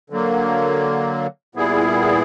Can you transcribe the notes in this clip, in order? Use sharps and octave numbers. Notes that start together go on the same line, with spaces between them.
D3 F#3 A#3
A#2 G3 B3 E4 G#4